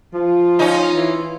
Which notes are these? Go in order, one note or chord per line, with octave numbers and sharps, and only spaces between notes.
F3 F4
C#4 D#4
E3